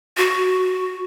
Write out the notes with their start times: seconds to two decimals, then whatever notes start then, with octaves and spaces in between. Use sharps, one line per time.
0.17 F#4